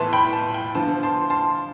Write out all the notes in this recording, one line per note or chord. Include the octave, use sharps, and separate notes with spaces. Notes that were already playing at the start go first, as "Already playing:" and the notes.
Already playing: A2 E3 B3 A5 C6
G5 B5
A5
G5
D3 F3 B3 A5
A5 C6
A5 C6